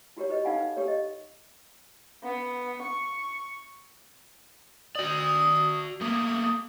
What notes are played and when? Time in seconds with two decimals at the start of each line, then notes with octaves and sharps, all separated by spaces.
0.17 E4 F#4 G4 A#4 C#5
0.29 G4 B4 D#5
0.44 D#4 A4 F5 F#5 G#5 B5
0.57 B4
0.77 G4 A4 A#4 C#5
0.88 D#5
2.23 B3
2.82 C#6
4.96 F#4 D5 D#6
6.01 A3 A#3 D#6